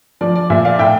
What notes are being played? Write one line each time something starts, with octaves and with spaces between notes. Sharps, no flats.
F3 D5
D5
A#2 E5
D5 F5
A2 E5 G5